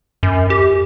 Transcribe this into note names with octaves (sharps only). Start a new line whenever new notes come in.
F#2
G4